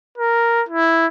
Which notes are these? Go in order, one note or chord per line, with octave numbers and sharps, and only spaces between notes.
A#4
E4